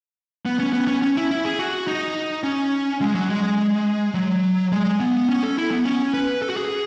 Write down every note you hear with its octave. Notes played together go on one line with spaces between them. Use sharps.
B3
C#4
B3
C#4
C#4
E4
E4
G#4
F#4
D#4
C#4
G#3
F#3
G#3
F#3
G#3
B3
C#4
A4
E4
B3
C#4
B4
A4
F#4
G#4